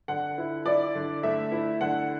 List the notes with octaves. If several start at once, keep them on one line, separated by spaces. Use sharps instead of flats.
D3 F#5
E4
E4 D5
D3
A3 E5
E4
D3 F#5